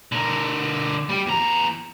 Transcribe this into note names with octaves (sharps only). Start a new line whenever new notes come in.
D3 A#4
G3 G4
E2 A#5